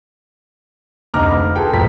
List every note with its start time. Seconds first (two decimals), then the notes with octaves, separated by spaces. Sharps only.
1.14 F1 D2 D#4 A#5 D6 F6
1.29 B5
1.56 F4 G#4 A4 B4 G5
1.73 D1 G#2 D#3 F3 B6